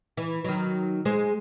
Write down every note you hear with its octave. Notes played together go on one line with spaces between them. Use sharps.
E3
D#3 F#3
G#3 G#4 C5